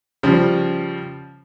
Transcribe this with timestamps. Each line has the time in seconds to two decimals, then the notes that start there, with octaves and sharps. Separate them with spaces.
0.23 C#3 F3 G3